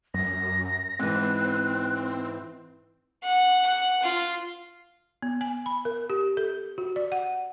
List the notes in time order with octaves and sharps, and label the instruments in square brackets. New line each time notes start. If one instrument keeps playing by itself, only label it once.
[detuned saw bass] F#2 [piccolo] A#6
[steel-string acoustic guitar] G#2 E3 [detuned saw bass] C4 [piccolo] F#6
[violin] F#5
F#5
F4
[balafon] B3
G#5
B5
A#4
G4
A4
F#4
D5
F#5